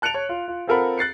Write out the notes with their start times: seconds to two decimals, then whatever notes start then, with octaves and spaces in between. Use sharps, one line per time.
0.02 A5 F#6 C#7 D7 F7
0.14 C#5
0.29 F4
0.48 F4
0.67 C4 F4 A4 A#4 F#5 B5
0.98 F#6 A6 C7 C#7